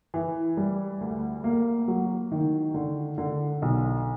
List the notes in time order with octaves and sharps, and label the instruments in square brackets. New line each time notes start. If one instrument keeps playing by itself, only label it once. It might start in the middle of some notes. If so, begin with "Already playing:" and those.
[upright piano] E3
G3
D2
A#3
F#3
D#3
D3
D3
B1